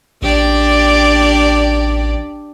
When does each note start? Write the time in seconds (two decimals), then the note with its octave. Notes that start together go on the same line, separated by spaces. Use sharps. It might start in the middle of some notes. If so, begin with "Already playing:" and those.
0.22 A1 D4 G4 D5